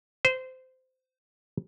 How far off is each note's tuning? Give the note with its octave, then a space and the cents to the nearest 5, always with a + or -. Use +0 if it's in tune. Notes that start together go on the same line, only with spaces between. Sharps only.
C5 -20